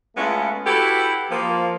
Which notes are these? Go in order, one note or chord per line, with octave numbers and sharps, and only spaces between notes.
G#3 A3 B3 C#4 E4 F4
E4 F#4 G4 A4 B4
F3 A#3